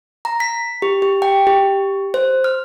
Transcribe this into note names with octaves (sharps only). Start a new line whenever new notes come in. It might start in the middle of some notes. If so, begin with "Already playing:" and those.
A#5
B6
G4
G4
G5
G4
C5
F6